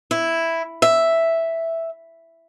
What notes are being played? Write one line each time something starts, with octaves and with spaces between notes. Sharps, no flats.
E4
E5